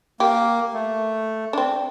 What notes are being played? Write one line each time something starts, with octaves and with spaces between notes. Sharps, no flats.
A#3 G4
A3
C4 D4